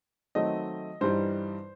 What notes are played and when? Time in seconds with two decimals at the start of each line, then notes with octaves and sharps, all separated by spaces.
0.35 D#3 F#3 A3 C4 D#5
1.01 G2 E3 G3 D#4 C5